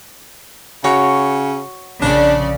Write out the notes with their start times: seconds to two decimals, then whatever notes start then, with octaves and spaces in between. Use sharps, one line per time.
0.84 C#3 F#4 C#5
2.02 A#1 C#3 D4 D5